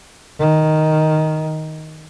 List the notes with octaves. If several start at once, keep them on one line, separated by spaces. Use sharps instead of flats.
D#3